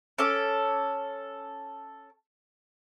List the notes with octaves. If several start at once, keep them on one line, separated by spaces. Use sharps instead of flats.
C#4 A4 D6